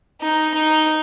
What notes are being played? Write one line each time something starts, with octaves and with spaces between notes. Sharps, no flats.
D#4
D#4